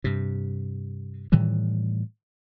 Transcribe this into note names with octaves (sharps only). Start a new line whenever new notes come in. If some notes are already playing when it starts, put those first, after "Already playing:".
G2 C3
A2 D#3 E3 G3